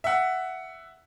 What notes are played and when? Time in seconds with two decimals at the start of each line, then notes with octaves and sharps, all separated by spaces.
0.04 E5 F#5